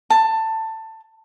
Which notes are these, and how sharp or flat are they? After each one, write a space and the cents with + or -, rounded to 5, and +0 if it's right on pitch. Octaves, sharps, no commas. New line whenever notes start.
A5 +15